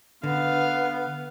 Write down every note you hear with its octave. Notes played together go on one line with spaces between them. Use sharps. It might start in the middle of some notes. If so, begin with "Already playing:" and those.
D3 B3 F5